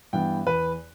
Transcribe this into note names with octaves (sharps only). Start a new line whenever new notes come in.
G2 E3 B3 G5
E2 B4